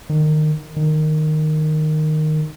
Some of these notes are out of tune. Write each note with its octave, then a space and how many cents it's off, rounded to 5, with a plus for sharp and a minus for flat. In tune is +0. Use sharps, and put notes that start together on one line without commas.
D#3 -20
D#3 -10